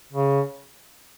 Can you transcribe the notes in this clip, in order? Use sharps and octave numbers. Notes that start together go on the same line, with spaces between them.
C#3